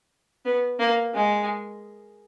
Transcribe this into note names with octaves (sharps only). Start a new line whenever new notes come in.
B3
A#3
G#3